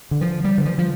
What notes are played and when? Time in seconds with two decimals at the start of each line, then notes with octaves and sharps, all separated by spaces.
0.11 D3
0.21 F3
0.44 G3
0.58 D3
0.65 F3
0.78 F3